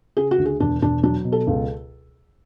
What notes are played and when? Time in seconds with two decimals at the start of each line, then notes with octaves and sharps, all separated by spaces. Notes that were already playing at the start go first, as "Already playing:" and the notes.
0.17 C#3 G#4
0.31 F#4
0.38 D2
0.45 G#4
0.60 E1 D4
0.82 E1 D4
1.03 F#3 D4
1.24 B2
1.32 A4
1.47 C#2